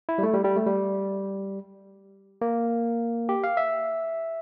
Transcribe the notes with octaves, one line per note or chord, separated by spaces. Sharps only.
E4
G3
A3
G3
G3
A3
G3
A#3
G4
F5
E5